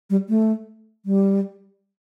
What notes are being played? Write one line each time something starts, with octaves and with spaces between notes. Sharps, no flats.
G3
A3
G3